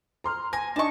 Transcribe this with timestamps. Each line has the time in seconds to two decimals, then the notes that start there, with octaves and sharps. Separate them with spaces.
0.24 A#5 C6 F6
0.53 G#5 A#6
0.76 D4 D#4 D#5 A5 C#6